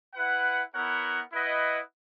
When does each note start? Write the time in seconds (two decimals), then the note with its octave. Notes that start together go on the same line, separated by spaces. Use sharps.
0.14 E4 B4 F#5
0.73 B3 E4 A#4 C#5 F#5
1.33 E4 B4 D#5 F#5